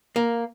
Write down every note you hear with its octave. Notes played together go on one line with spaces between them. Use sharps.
A#3